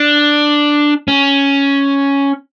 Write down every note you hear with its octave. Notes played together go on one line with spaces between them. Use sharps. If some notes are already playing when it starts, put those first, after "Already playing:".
Already playing: D4
C#4